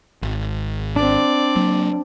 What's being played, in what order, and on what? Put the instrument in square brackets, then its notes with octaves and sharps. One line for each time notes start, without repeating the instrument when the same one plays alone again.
[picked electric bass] G#1
[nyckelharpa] C4 D5 [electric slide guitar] D4
[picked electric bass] F#3 A#3